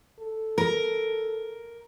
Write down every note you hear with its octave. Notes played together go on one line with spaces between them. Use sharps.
A4
A#4